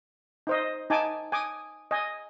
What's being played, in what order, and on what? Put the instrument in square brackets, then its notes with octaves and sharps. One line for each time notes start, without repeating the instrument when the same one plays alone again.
[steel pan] D#4 C5 D#5
D#4 G#5 A5 D6
G#5 D6 D#6
D#5 G#5